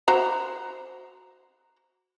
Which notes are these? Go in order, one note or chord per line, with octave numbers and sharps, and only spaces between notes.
F#4 C5 A#5